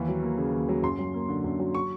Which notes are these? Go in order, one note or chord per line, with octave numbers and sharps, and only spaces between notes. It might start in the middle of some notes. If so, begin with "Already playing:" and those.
Already playing: D#2 E3
F#3
A#3
C#3
D#2
F#3
F#2 C6
F#3
A#3
D3
F#2
F#3
C#6